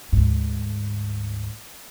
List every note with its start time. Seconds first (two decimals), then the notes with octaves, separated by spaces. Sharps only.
0.12 D2 G#2